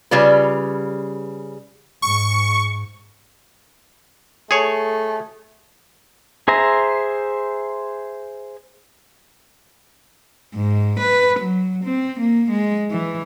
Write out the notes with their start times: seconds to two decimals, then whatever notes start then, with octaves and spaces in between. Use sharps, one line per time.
0.11 C#3 G3 F4 B4
2.02 G#2 C#6
4.51 A3 G#4 C#5
6.48 G#4 C5 E5 A#5
10.55 G#2
11.00 B4
11.40 F#3
11.84 C4
12.20 A#3
12.51 G#3
12.91 E3